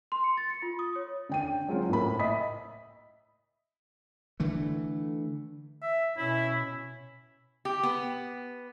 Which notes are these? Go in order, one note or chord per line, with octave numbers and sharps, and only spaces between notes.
C6
C#7
A6
C#7
F4
D#6
C#5
D3 G5 D#7
F#3 G#3 C4 C#4 F4
A2 A#3 B5
D#5 E5 B5 D#6 B6
D3 E3 A3
E5
B2 C#4 E4
G4
B3